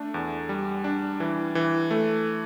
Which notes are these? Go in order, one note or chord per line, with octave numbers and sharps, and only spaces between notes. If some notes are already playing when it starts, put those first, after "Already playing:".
Already playing: A3 D4
E2
G3
D4
E3
E3
A3